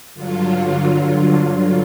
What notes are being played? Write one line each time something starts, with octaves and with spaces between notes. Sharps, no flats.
G2 D3 F#3 F4
F4